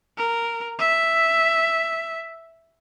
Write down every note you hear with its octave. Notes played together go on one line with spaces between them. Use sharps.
A#4
E5